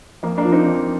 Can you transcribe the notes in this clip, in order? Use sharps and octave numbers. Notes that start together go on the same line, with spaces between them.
F2 A#3
A#3 D4
F3
C4 D#4
F2